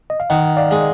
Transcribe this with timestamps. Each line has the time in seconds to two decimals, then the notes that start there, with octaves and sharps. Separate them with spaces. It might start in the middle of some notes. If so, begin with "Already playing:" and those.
0.10 D#5
0.20 F5
0.30 D#3 D#5 F#5
0.57 D5 F5
0.71 G#3